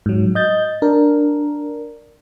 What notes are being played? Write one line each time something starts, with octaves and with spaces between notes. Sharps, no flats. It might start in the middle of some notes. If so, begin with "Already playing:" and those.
G#2 F#3
D#5 G6 A6
D4 A#4